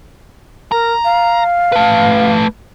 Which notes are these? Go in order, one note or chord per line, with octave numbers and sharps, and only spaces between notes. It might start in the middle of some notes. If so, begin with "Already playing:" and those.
A#4 A#5
F5
A3 B4